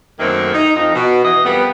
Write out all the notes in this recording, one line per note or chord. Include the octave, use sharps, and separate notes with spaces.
F#2 D#3 A3 A#3 C4 A4
D#4
F2 D#4
B2
B2 E3 D#5
F2 G3 A#3 B3